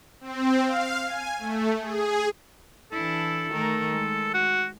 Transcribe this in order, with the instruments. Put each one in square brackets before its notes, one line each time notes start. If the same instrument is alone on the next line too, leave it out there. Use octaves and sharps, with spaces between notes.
[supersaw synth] C4
F5
G#5
A3
G#4
[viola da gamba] E3 D4 E4 [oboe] A4
[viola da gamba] D#3 A3 A#4
G#3
[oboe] F#4